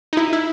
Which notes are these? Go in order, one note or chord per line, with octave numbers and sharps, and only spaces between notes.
D#4
E4
E4